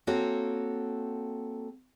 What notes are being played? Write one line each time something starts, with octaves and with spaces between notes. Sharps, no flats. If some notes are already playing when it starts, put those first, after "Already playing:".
A#3 C4 F#4 A4 C#5